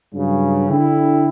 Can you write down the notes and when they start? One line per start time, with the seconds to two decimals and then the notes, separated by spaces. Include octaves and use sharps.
0.13 G2 C#3 F#3
0.69 D3 E4 G5